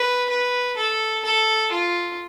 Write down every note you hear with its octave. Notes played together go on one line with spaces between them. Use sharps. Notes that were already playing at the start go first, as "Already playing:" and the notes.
Already playing: B4
B4
A4
A4
F4